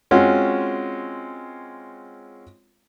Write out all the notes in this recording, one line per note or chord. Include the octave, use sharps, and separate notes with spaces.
G#3 C4 C#4 F4 F#4